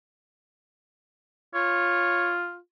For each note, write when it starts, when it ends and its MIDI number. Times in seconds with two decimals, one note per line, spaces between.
1.55 2.58 65
1.55 2.33 73